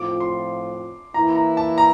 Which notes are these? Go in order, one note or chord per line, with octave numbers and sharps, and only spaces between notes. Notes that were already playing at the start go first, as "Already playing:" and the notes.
Already playing: A2 F3 C4 F4 D6
C6
E3 A#3 E4 A#5
A#5
A5
A#5